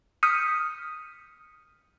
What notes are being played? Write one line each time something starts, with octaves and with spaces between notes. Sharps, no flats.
D#6 F6 G6 B6 C#7 D#7